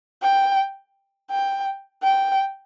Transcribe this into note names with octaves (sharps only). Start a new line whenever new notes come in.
G5
G5
G5